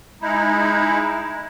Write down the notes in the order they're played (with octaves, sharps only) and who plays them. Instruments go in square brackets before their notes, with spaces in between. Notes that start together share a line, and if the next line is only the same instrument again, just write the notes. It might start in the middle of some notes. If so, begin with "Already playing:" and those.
[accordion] G#3 D#4 E4